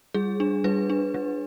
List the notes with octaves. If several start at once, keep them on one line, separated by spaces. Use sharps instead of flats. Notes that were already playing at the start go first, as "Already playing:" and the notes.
G3 G#4
D4
G3 B4
D4
G3